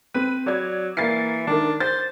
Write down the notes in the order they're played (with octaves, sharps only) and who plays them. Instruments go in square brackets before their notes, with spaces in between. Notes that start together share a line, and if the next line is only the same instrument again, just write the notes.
[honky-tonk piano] C4 D#7 [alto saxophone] B4
[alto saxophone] F#3 [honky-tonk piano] D5 G#6
[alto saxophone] E3 [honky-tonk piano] A#3 A6 C7
[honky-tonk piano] D#3 A#4 [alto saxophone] D4
[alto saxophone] C5 [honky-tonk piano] A6